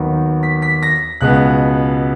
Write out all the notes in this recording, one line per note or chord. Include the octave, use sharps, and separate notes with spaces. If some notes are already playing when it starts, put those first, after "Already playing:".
Already playing: D#2 D#3 F#3 B3 D#4
B6
B6
A#6
C#2 B2 G#3 B3 F#6